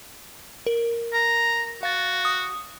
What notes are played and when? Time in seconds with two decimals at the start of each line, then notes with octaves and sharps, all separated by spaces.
0.67 A#4
1.13 A#5
1.83 F#4 F5 A6
2.25 D#6